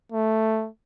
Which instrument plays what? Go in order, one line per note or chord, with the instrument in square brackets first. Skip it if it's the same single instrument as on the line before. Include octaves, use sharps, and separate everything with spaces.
[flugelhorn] A3